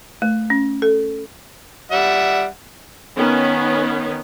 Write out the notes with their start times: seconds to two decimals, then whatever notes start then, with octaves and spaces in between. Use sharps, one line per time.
0.22 A3
0.50 C#4
0.82 A4
1.91 G3 E5 F#5
3.17 D#3 B3 C#4